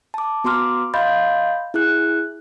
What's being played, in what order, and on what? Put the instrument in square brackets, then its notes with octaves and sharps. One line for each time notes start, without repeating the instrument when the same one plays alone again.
[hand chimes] A5 D6
B3 F#4 A#5 C6 D6 F6
D#5 F5 B5 C6 G6 A6
E4 G#4 F#6